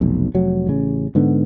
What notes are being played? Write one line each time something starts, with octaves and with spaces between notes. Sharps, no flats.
F1 B1
F1 F#3
A1 C#3
G#2 D3 B3